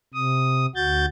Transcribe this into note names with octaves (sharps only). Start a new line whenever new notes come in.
C3 D#6
D2 F#4 G6 A6